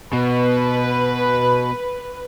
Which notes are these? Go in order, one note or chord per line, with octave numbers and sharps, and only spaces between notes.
B2 B4